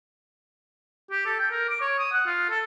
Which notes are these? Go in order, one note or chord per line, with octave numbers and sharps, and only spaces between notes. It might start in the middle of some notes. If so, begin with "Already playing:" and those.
G4
A4
G5
A#4
D6
C#5
D#6
F#5
F4
A4